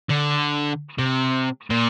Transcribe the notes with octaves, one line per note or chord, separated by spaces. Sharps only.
D3
C3
A#2